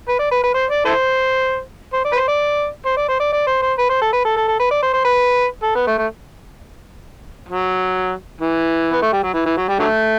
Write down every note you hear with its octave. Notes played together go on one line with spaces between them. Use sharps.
B4
D5
B4
B4
C5
D5
E4 A4 C5
C5
D5
B4
C5
D5
C5
D5
C5
D5
D5
C5
C5
B4
C5
A4
B4
A4
A4
A4
B4
D5
C5
C5
B4
A4
B3
A3
A3
F#3
E3
B3
A3
G3
F#3
E3
E3
F#3
G3
D3 F#3 A3